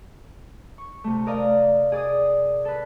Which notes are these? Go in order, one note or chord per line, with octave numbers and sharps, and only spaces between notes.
C#6
C3 A3
A#4 D5 D#5 F5
G#4 D5 D6 D#6
A4 B4